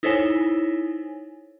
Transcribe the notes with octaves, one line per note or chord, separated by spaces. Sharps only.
D#4 E4 A4 C5 C#5 G#5